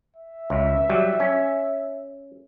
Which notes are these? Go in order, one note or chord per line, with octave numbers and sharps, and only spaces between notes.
E5
C#2
F#3 G3
C#4